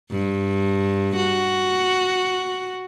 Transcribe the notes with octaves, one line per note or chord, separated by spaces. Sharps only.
G2
F#4